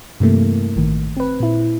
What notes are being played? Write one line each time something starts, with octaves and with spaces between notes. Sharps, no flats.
G2 C3 E3 A3 A#3
A1 A2 D#3
C4 B4
A#2 E4